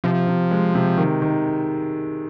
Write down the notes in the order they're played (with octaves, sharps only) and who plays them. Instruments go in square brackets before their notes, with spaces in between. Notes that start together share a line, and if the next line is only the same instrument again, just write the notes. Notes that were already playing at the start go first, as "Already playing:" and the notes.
[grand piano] C3 [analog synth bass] F3
[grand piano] C3
G#3
C3
D#3
D#3